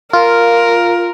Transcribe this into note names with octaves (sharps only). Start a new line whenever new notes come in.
F4 A#4